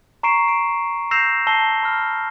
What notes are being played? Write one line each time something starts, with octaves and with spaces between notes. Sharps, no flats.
A#5 C#6 C7 D7 E7
D7
E6 G6 A#6 C7 E7 F7
A5 E6 A#6 C7 G7
B5 F6